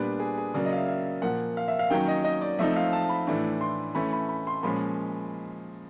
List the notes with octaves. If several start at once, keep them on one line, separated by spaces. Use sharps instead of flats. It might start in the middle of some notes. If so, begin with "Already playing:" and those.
Already playing: A#2 G3 B3 D4 B4
G#4
G#4
C#3 F#3 A#3 D5
D#5
F5
E5
E5
A#2 F3 A#3 F#5
F5
E5
F5
D#3 F#3 A#3 C#4 G5
D#5
D#5
D5
F3 A3 C4 D#4 E5
F5
A5
B5
A2 E3 A3 D4
C6
E3 A3 C#4 B5
B5
B5
C6
A#2 F3 G#3 C#4 B5